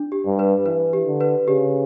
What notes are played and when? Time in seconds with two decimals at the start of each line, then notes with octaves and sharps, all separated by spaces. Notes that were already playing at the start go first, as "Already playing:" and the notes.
Already playing: D4
0.12 G4
0.26 G2
0.39 B4
0.66 E3 B4
0.93 G4
1.07 D3
1.21 B4
1.47 C#3 G4